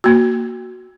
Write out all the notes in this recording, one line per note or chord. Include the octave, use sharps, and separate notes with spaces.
A#3 F#4